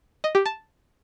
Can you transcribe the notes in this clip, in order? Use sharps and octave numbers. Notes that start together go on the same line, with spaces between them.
D#5
G4
A5